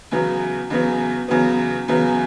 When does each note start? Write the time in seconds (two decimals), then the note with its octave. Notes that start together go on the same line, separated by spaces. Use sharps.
0.11 E2 C#3 F#3 B3
0.70 E2 C#3 F#3 B3
1.28 E2 C#3 F#3 B3
1.88 E2 C#3 F#3 B3